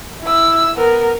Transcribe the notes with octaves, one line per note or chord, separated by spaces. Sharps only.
E4 E6
B3 A#4